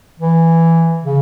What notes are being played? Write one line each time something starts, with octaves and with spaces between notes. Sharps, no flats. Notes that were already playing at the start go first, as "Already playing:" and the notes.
E3
C#3